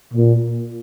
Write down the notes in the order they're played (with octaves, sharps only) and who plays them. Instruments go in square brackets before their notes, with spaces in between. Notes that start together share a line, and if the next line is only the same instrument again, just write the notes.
[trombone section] A#2